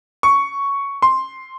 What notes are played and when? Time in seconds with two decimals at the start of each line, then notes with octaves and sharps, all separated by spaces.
0.23 C#6
1.02 C6